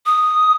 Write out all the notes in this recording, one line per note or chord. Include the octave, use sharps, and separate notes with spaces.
D#6